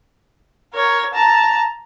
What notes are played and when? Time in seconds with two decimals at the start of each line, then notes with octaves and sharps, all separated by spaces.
0.74 A#4 C#5
1.13 A5 A#5